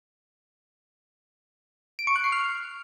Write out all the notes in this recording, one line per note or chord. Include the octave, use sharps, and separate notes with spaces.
D7
C#6
F#6
C7
F6